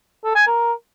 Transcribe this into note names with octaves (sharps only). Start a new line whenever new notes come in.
A4
G#5
A#4